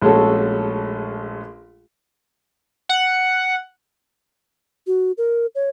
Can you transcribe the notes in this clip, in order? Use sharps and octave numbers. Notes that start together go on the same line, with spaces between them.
A#1 G#3 A3 C#4 F#4 A4
F#5
F#4
A#4
C#5